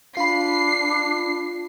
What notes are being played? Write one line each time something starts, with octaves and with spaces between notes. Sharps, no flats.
D4 F4 B5 C7